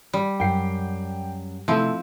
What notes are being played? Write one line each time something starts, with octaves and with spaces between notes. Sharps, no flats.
G3
F#2 F#5 G5 C7
C3 F3 A3 C4 D#4 E4 A4